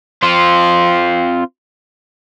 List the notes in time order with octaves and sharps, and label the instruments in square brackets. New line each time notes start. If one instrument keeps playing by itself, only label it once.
[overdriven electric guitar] C4 F4